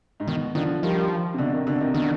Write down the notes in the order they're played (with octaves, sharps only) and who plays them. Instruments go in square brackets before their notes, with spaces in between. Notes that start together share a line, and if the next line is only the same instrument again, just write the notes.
[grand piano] G#2
[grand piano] B2 [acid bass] D#3
[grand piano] D3 F3 [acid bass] D#3
[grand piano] D#3 G3 [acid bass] F3
[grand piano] C3
B2 D3
C3 D#3
B2 D3
C3 D#3
[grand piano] B2 D3 [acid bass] D#3